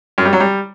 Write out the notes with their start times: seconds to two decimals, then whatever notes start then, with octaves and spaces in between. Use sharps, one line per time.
0.18 F#2
0.25 G3
0.33 F#3
0.40 G3